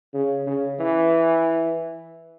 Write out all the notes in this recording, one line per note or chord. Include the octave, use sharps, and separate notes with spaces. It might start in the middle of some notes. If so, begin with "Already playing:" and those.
C#3
C#3
E3